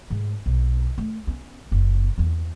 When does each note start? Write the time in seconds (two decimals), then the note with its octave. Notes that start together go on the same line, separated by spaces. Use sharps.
0.10 G#2 A3
0.46 B1
0.98 A3
1.27 B3 C#4
1.71 F#1 B3
2.18 E2 A#3